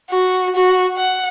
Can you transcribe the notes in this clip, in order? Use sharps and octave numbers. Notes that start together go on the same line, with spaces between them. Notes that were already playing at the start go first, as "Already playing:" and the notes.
F#4
F#4
F#5